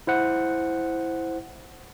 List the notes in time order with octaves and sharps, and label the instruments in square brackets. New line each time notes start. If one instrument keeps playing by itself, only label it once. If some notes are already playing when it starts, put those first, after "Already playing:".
[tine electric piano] E4 C5 F#5